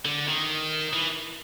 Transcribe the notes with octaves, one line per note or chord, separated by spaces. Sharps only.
D3
D#3
E3